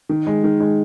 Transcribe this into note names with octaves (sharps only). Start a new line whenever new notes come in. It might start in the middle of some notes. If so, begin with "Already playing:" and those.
D#3
G#3
D#3
G#3